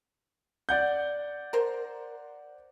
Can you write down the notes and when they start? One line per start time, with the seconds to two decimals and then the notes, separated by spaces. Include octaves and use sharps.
0.69 D5 F#5 G6
1.53 A#4 C5